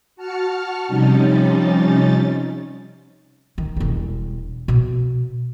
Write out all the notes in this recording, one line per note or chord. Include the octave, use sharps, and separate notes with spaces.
F#4 A5 F6 C#7
C3 F3 G3 C#4 D#4 A6
D#3
E1 G3
B2